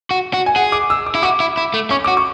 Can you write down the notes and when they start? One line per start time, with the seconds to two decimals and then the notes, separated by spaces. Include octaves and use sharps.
0.11 F#4
0.34 F#4
0.46 G#5
0.56 G#4 F#5
0.72 D6
0.90 E6
1.06 D6
1.15 E4
1.23 F#4 D6
1.40 E4
1.57 E4
1.74 A3
1.90 C#4 C#6
2.04 F#4 D6
2.17 C#6